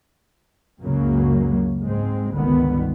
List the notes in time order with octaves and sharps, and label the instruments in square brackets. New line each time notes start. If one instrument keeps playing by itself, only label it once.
[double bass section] C#2 F#2 C#3 F#3 A#3
G#2 G#3 C4
G1 C#2 D3 D#3 B3